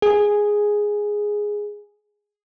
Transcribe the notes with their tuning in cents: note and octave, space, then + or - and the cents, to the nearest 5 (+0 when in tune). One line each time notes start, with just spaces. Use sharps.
G#4 +0